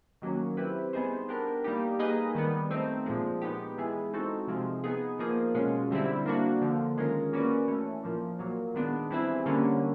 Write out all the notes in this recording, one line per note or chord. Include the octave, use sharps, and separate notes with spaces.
D#3 F#3 A#3 C#4
C4 E4 G4 B4
G3 B3 D#4 G#4 C5
B3 D4 G4 A#4
G3 A#3 D#4 G4
A#3 D#4 G#4 B4 D#5
D#3 G3 B3
A3 C4 D#4
A#2 F3 G#3
G#3 B3 D#4 G4
E3 G#3 B3 E4 G#4
G#3 C4 D#4 F#4 A4
C3 F3 G#3 C4
B3 D#4 G#4
F3 A#3 D#4 G#4
B2 G#3 C#4 F4
D3 G3 C4 E4
A#3 D4 F#4
D3 F3 A#3
D#3 G#3 C#4 F4 A#4
A#3 C#4 F#4 B4 D5
E3 A3 C#4
A#2 F3 A#3
A#2 F#3 A#3
D#3 G#3 B3 D4
E3 G3 C4 E4 G#4
D3 G3 A#3 C#4